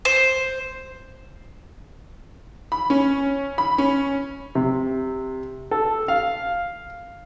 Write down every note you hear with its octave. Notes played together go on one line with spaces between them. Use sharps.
C5
B5
C#4
B5
C#4
C3
A4
F5